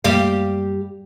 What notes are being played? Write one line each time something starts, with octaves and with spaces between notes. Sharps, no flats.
F#2 G3 A#3 G4 F5